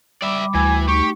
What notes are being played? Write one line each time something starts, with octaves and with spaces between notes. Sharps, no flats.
G3 D5 E5 B5 D6
D2 E3 G#5
A3 D#4 G4 C#6